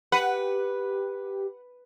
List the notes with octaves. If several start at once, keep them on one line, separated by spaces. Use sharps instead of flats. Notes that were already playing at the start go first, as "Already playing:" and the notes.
G4 B4 F#5